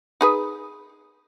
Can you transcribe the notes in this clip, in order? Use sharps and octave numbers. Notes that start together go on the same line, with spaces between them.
D#4 G#4 B4